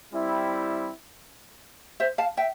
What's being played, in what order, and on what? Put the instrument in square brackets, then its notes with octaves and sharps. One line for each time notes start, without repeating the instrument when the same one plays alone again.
[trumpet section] G3 C4 E4
[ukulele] C5 E5
F5 A5
E5 G5